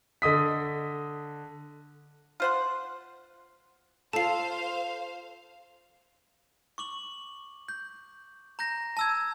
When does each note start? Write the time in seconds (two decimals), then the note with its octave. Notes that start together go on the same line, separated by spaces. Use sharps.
0.22 D3 D#5 D#6 B6
2.40 F4 C5 F#5
4.13 F4 A4 C5 F5 A5 C7
6.78 C#6 D6 F#7
7.69 G6
8.59 A#5 G6 A#6
8.97 A5 E6 G#6